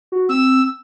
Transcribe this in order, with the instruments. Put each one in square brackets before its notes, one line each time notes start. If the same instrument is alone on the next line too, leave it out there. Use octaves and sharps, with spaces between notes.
[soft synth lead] F#4
[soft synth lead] C4 [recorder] E6